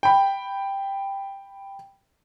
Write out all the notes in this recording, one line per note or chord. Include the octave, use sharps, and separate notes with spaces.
G5 B5